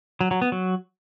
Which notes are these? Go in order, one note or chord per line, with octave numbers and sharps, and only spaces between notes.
F#3
F#3
B3
F#3